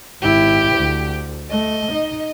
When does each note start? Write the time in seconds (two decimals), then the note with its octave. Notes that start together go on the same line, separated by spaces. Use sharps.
0.21 G#1 E4 G4
0.75 D2
1.50 A3 D#5
1.92 D#4